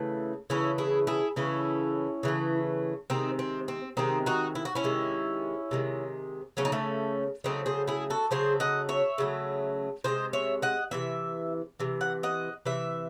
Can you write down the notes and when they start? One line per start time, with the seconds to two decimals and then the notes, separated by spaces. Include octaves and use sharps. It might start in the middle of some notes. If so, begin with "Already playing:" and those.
Already playing: C#3 E3 A3
0.50 C#3 E3 A3 C#4 E4
0.78 E4 G#4
1.07 E4 G#4
1.36 C#3 E3 A3 C#4 E4
2.23 C#3 E3 A3
3.10 C3 D#3 G#3 C4 D#4
3.39 C4
3.68 C4
3.97 C3 D#3 G#3 C4 D#4
4.26 D#4 F#4
4.55 E4
4.65 F#4
4.75 C#4 E4
4.84 C3 D#3 G#3
5.71 C3 D#3 G#3
6.57 C#3 F#3 A3 C#4
6.65 D#4
6.72 A3 C#4
7.44 C#3 F#3 A3 C4 D#4
7.66 G#4 C5
7.87 E4 G#4
8.10 F#4 A4
8.31 C#3 F#3 A3 G#4 C5
8.60 D#5 F#5
8.89 C#5 E5
9.18 C#3 F#3 A3
10.04 C3 E3 G#3 C5 D#5
10.33 C#5 E5
10.62 D#5 F#5
10.91 C3 E3 E5
11.80 C3 E3
12.01 F#5
12.23 D#5 F#5
12.65 C3 E3 E5